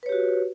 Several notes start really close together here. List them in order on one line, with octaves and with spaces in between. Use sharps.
B4 C#5 G4 F#4